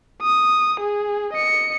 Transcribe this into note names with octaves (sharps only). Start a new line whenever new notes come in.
D#6
G#4
D#5 C#7